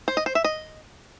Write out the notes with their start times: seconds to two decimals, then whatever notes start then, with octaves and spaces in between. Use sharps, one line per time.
0.08 C5
0.17 D#5
0.26 C5
0.35 E5
0.44 D#5